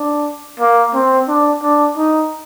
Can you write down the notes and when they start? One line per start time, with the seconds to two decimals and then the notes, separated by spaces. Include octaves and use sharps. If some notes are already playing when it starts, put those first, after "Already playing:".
Already playing: D4
0.60 A#3
0.94 C4
1.28 D4
1.62 D4
1.97 D#4